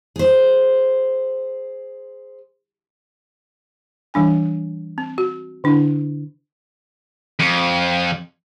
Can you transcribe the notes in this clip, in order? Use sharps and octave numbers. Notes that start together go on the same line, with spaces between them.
G#4 C5
E3 G3 D4 G#5
C4
F#4
D3 D4 E4
F2